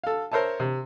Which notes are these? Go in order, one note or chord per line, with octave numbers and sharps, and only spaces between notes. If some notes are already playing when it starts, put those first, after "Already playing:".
A4 F5
A#4 C5 C#5 E5 A5
C3